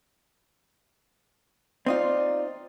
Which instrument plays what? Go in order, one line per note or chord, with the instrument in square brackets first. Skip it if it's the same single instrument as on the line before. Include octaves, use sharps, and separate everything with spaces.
[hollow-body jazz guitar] C4 D#4 F4 [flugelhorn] D5